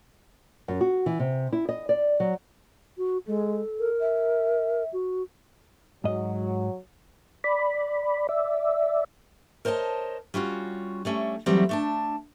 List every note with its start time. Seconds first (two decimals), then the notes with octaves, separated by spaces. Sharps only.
0.68 F#2
0.81 F#4
1.06 E3
1.19 C3
1.52 E4
1.69 D#5
1.89 D5
2.20 F#3
2.97 F#4
3.27 G#3 A4
3.79 A#4
4.00 E5
4.93 F#4
6.04 G#2 F#3 D#5
7.44 D5 B5
8.29 D5 E5
9.65 A#4 C5 C#5 D#5 A5
10.34 G3 C#4 F4 F#4
11.05 G3 A3 C#4
11.46 E3 F#3 G3 A3 B3 C4
11.69 A3 D4 A5